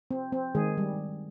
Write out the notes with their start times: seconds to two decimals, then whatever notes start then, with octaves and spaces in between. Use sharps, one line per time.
0.11 C4
0.33 C4
0.55 D#3 G#3 G#4
0.78 G3